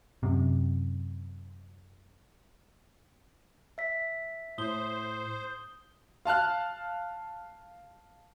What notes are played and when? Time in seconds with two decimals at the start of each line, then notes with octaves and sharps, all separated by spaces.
0.23 F#2 C3
3.78 E5 B6
4.58 A2 C5 D#6 G7
6.25 F5 A5 F6 F#6